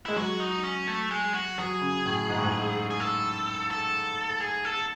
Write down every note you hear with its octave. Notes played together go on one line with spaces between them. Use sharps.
G#3 E4
F#3 F#4
D#4
C#4
A3
G#3
F#4
F#3 G#4
C#3
A2
G#2
A2
G#2
G#4
A4
A4
G#4
A4